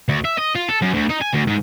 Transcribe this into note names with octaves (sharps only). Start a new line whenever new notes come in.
D2
E5
D#5
F4
A4
F#2
D2
D#4
G#5
D2
G#2